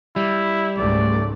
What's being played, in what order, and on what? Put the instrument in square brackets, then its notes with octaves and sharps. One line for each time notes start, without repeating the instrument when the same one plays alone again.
[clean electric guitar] G3 [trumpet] E4
[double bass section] C#2 G#2 A3 [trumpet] D5